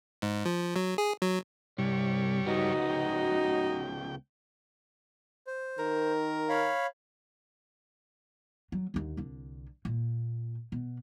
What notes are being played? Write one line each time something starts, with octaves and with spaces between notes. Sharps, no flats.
G#2
F3
F#3
G#4
F#3
C2 G2 G3 C#5
C#2 B3 D#4 F#4
G5
C5
D#3 A#4
C#5 F5 B5
F#3
D#2 D3
C2 D3
A#2
B2